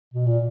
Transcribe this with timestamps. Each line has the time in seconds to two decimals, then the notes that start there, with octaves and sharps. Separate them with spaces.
0.14 B2
0.26 A#2